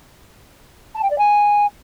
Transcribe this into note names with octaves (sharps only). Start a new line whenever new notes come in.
A5
G5
D5
G#5